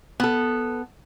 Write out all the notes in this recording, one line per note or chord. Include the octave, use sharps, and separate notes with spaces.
B3 A4